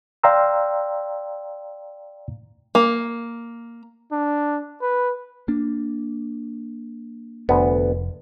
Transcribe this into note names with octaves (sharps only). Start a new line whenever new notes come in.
D5 F5 G5 A#5 C6 E6
A#3
D4
B4
A#3 D4
F1 D2 B3